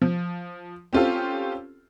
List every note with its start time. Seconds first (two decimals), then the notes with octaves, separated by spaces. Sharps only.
0.02 F3
0.93 C4 C#4 F4 G4 A4 C5